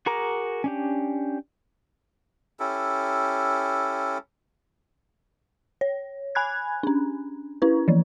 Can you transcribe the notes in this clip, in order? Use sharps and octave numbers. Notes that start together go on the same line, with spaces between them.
F#4 G#4 A#4 A#5 D6
C#4 D4 G4
C#4 E4 G4 A4
C#5
G#5 B5 F#6 G#6
C#4 D4
C#4 E4 B4
E3 F3